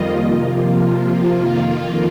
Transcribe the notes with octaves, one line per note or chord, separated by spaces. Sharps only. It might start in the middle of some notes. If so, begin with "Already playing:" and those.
Already playing: F2 D#3 G3 A#3 F4 D#5
C3 F3 A#3
F2 D#3 A#3 F4